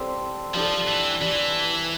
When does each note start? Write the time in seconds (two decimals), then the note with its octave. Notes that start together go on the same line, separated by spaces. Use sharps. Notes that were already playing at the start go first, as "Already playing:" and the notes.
Already playing: G3 C4 G4 A4 C5 D5
0.54 F3 G3 D4 A4
0.88 E3
1.21 E3 G3 D4 G4